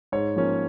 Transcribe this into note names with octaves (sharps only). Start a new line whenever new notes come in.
G#2 C#5
F3 A#3 C#4